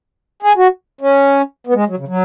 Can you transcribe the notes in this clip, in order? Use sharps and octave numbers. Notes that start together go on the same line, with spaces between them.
G#4
F#4
C#4
B3
G#3
F#3
C#3
F#3